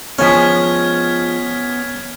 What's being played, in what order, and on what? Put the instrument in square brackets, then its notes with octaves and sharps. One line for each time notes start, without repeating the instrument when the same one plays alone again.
[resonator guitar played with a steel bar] F3 G#3 [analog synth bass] B3 [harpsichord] C#4 [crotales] F6 G#6 B6